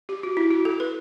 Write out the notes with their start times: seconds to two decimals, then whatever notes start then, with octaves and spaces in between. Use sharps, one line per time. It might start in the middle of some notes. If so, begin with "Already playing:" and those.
0.09 G4
0.23 F#4
0.37 E4
0.51 F#4
0.65 A4
0.80 B4